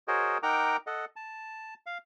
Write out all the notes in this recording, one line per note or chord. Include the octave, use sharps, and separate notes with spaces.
F#4 G#4 A#4 C5 C#5 D#5
D#4 A#4 F#5 G5 A#5 D6
A4 D#5 F#5
A5
F5